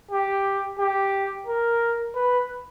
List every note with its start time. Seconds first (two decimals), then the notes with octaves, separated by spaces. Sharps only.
0.11 G4
0.79 G4
1.47 A#4
2.15 B4